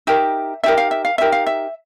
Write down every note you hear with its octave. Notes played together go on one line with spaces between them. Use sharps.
D#4 G4 A#4 E5
D#4 G4 A#4 E5
F5
E5
F5
D#4 G4 A#4 E5
F5
E5